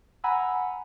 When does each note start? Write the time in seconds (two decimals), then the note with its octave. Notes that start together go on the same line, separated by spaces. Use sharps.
0.24 F#5 G#5 A#5 B5 E6